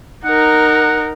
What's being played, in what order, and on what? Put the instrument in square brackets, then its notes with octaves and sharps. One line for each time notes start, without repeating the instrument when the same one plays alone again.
[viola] D#4 A#4 [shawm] F#5